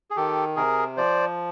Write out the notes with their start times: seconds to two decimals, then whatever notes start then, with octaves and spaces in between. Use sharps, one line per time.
0.11 G#4
0.16 D#3 G4 A4
0.56 C3 G#4 A#4
0.97 F3 C5 D5